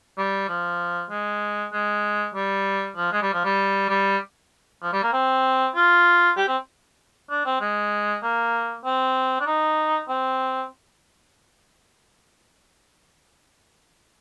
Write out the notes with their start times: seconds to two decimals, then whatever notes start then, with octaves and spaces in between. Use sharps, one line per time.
0.18 G3
0.48 F3
1.10 G#3
1.73 G#3
2.34 G3
2.96 F3
3.12 G#3
3.22 G3
3.33 F3
3.45 G3
3.89 G3
4.82 F3
4.93 G3
5.03 A#3
5.13 C4
5.75 F4
6.37 G4
6.48 C4
7.30 D4
7.46 C4
7.61 G#3
8.22 A#3
8.84 C4
9.40 D4
9.46 D#4
10.08 C4